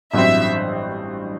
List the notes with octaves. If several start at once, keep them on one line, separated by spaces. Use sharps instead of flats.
A1 G2 F#3 C4 E5